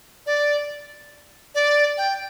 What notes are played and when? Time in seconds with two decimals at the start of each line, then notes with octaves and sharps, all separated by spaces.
0.26 D5
1.55 D5
1.98 G5